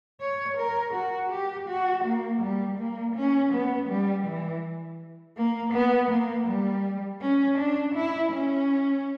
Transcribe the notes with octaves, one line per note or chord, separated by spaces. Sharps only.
C#5
A#4
F#4
G4
F#4
A#3
G3
A#3
C#4
B3
G3
E3
A#3
B3
A#3
G3
C#4
D4
E4
C#4